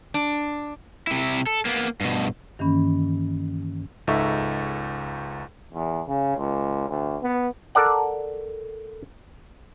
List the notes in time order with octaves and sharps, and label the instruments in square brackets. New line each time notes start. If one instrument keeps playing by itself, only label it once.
[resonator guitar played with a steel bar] D4
[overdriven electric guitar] C3 E4
A4
A#3 B3
G2 B2
[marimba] G2 D#3 E3 A#3 C#4 B5
[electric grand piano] C#2 G#2 D#4 A4 E5 C#6
[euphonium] E2
C#3
C#2
D2
B3
[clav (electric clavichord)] A4 A#4 D5 F#5